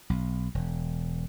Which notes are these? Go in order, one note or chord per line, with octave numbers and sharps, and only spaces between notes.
B1
E1